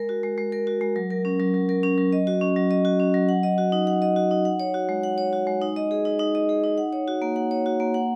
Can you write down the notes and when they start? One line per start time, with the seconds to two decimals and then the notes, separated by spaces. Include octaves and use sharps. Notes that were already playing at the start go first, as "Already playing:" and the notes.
Already playing: G#3 A#4
0.09 F#4
0.23 G#3
0.38 G#3
0.52 A#4
0.67 F#4
0.81 G#3
0.96 F#3
1.10 A#4
1.25 C#4
1.40 F#3
1.54 F#3
1.69 A#4
1.83 C#4
1.98 F#3
2.12 D#5
2.27 F#4
2.41 C#4
2.56 F#3
2.71 D#5
2.85 F#4
3.00 C#4
3.14 F#3
3.29 F#5
3.43 D#5
3.58 F#4
3.72 D#4
3.87 F#5
4.02 D#5
4.16 F#4
4.31 D#4
4.45 F#5
4.60 C#5
4.74 F#4
4.89 G#3
5.03 F#5
5.18 C#5
5.33 F#4
5.47 G#3
5.62 D#4
5.76 D#5
5.91 G#4
6.05 D#4
6.19 D#4
6.35 D#5
6.49 G#4
6.64 D#4
6.78 F#5
6.93 C#5
7.08 F#4
7.22 A#3
7.36 F#5
7.51 C#5
7.66 F#4
7.80 A#3
7.94 F#5